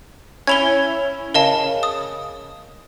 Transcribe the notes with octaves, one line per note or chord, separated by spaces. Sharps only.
C#4 E4 G#6 F7 G7
C#3 A#4 D#5 A5
D#6